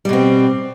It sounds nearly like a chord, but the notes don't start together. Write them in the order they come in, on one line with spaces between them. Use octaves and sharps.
G3 B2 C4